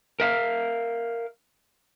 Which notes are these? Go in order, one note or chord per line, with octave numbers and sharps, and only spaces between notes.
A#4 E5 F5